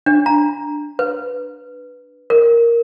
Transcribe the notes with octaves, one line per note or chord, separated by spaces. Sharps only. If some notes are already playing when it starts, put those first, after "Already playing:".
D4
A#5
B4
A#4